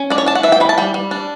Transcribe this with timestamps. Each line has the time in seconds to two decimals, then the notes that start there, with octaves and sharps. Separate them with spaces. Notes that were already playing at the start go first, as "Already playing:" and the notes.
Already playing: C#4
0.10 D4 D5
0.18 C#5
0.26 D4 A5
0.35 F#5
0.43 E3 E5
0.52 G5
0.60 E3 B5
0.69 A5
0.78 G3 G5
0.94 G3
1.11 D4